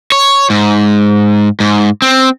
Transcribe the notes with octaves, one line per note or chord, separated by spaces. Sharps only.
C#5
G#2
G#2
C4